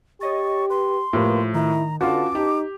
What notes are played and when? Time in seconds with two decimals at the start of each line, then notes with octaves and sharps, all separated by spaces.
0.21 G4 C#5 D#5 C#6 A6
0.70 B4 C6
1.13 A2 F3 A#3 G4 B4
1.54 D#3 E4 A#5
2.01 D3 C#4 F4 F#4 B4 A5 D6
2.35 D#4 G4